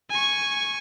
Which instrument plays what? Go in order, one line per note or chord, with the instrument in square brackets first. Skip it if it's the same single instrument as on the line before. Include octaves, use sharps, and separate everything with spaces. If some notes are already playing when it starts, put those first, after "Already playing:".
[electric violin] G#5 C#6